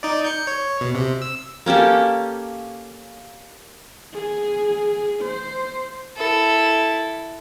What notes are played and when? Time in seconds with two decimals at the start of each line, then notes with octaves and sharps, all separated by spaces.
0.03 D#4 D5
0.24 G6 C#7
0.47 C#5
0.81 B2
0.95 C3
1.22 E6
1.66 A#3 C#4 G4 A4
4.13 G#4
5.22 C5
6.18 E4 A4